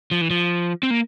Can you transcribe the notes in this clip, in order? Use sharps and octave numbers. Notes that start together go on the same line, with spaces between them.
F3
E3
F3
C4
A#3